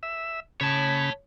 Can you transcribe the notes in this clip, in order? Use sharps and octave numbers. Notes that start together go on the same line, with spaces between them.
E5
C#3 C#5 A5 B5